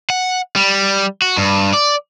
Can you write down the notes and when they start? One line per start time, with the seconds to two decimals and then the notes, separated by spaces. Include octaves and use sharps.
0.10 F#5
0.56 G3
1.22 F#4
1.37 G2
1.73 D5